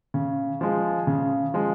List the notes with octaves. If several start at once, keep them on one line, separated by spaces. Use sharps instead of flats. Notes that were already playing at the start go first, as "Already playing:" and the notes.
C#3
F3 G#3
C#3
F3 G#3